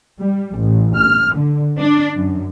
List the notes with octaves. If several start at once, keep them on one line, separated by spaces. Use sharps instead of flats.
G3
A1
F6
D3
D4
F#2